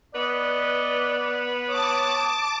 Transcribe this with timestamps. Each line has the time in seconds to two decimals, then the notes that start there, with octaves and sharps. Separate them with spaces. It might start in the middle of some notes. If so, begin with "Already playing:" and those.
0.15 B3 B4 D5 D#5
1.68 C#5 A5 D6 D#6